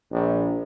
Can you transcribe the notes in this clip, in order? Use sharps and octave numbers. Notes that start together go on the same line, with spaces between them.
A#1